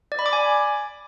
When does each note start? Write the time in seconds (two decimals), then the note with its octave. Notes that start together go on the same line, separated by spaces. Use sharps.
0.12 D5
0.19 B5
0.26 D6
0.33 G#5